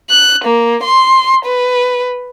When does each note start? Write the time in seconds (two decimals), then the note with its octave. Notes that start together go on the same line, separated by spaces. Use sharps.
0.10 F#6
0.45 A#3
0.83 C6
1.45 B4